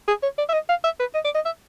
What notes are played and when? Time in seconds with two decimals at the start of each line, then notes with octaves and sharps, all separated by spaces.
0.08 G#4
0.23 C#5
0.38 D5
0.49 E5
0.54 D#5
0.69 F5
0.84 E5
1.00 B4
1.15 D#5
1.25 D5
1.35 D#5
1.46 E5